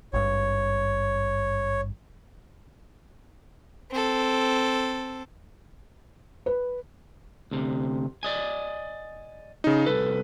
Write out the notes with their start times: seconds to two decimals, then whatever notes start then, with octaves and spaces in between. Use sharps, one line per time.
0.13 G#1 G2 C#5
3.91 C4 A4
6.46 B4
7.51 D2 C3
8.23 D5 D#5 G#5
9.64 C#3 D#4
9.87 C2 A4 B4